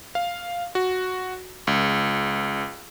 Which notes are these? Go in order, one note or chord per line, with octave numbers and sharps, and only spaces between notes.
F5
F#4
C#2